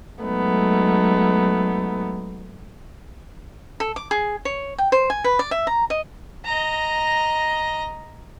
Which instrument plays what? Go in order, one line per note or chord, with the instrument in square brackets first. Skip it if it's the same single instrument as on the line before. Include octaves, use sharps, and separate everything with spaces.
[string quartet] F#3 G#3 A3 B3 D#4
[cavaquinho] A4
D6
G#4
C#5
G5
C5
G#5
B4
D5
E5
A#5
D#5
[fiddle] D#5 A#5